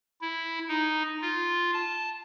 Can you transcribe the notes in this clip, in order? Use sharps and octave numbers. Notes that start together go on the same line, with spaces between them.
E4
D#4
F4
A5